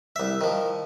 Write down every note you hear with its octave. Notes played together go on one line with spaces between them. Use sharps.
C2 E5
D#3 F3